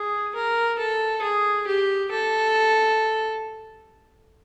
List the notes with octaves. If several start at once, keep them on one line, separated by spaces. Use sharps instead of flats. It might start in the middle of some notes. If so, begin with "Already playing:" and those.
Already playing: G#4
A#4
A4
G#4
G4
A4